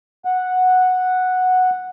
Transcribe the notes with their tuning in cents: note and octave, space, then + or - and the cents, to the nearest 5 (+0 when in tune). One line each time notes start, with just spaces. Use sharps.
F#5 -5